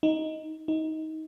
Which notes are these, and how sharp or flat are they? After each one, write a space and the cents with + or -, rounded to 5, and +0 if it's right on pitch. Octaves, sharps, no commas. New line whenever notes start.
D#4 +10
D#4 +20